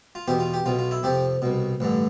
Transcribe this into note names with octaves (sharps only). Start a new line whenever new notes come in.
F4
E2 B2 G4
F4
G4
B1 B2 F4
F4
E4
F2 C3 F3 G4
C2 B2
A1 G2 D3